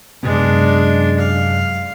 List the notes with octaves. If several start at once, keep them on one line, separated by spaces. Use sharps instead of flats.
F#2 C3 G#3 B3 D4
F5